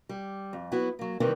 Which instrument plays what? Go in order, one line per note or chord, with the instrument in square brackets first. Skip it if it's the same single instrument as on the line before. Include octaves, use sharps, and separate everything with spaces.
[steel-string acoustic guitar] G3
F2
F#3 B3 E4 F#4
F#3 A#3
C3 D#3 E3 G3 B3 C4